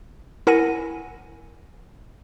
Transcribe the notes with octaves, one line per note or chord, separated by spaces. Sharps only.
E4 A#4 F#5 G#5 A#6 D#7